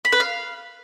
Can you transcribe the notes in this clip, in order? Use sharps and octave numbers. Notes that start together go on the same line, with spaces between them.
B5
B4
F5